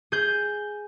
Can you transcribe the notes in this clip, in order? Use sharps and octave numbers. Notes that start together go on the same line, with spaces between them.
G#4 G6